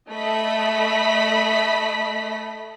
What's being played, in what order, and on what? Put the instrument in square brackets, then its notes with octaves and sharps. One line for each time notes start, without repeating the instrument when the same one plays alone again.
[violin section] A3 D#5 B5 B6